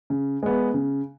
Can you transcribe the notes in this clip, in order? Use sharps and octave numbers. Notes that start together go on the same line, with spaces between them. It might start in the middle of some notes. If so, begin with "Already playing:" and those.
C#3
G#3 B3
C#3